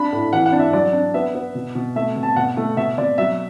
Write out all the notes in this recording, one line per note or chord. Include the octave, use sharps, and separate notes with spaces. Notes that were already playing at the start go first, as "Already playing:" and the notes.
Already playing: D4 B5
A2
E3 F#5
F#5
D4
E5
F#3 D5
D4
B3 E5
B3
B2
B2
A3 E5
B2
A5
B2 F#5
A3
B2 E5
B2 D5
F#3 E5